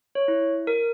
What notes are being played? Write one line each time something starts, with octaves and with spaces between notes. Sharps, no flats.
C#5
E4
A#4